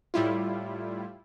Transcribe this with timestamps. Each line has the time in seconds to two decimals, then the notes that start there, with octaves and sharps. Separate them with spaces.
0.14 A2 G3 E4 F4